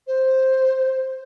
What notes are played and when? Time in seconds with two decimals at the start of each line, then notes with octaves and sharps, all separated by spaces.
0.07 C5